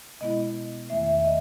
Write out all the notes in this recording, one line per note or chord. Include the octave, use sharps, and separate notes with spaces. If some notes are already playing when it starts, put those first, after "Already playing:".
B2 G#3 B3 E4 D#5
E2 D#3 A3 E5
E5
E5
D#5